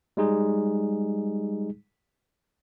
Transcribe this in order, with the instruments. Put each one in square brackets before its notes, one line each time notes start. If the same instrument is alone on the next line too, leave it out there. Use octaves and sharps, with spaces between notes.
[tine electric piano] G3 G#3 D#4 G#4